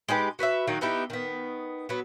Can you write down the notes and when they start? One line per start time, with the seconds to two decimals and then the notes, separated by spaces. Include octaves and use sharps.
0.09 G#3 D#4 G4 B4
0.39 F#4 B4 C#5 E5
0.68 D#3 F#3 A#3 D#4
0.81 B3 D#4 E4 G4
1.10 D#3 B3
1.89 F#3 B3